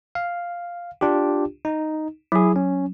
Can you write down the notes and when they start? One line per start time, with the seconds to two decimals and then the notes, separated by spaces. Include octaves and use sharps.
0.15 F5
1.01 D4 F4 G4
1.65 D#4
2.32 F#3 E4 G#4
2.56 C#4